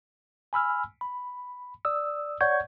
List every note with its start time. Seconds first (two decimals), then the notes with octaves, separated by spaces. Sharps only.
0.53 G#5 B5 E6 F6
1.01 B5
1.85 D5 D#6 E6
2.41 C#5 D5 F#5 C#6 G6 G#6